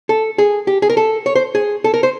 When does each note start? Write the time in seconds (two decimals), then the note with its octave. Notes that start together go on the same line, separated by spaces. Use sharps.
0.09 A4
0.38 G#4
0.67 G4
0.82 G#4
0.90 A#4
0.97 A4
1.26 C#5
1.36 C5
1.55 G#4
1.84 A4
1.94 A#4
2.03 C5